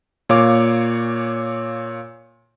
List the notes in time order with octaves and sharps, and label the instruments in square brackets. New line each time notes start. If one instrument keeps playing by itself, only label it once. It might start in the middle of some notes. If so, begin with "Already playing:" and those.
[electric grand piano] A#2 C#5 F5 D6